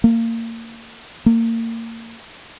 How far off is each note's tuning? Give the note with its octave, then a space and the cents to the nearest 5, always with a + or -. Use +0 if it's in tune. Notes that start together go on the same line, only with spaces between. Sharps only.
A#3 -30
A#3 -30